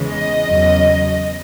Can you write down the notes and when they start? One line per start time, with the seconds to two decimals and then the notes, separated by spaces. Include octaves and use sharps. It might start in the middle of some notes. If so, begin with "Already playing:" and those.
Already playing: E2 C#3 E3 G#3
0.09 D#5
0.47 E2 C#3 F#3